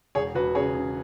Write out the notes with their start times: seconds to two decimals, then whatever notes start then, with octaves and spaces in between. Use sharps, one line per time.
0.15 E1 G#4 C#5
0.35 E1 F#4 B4
0.55 C#3 G#4 C#5
0.75 C#3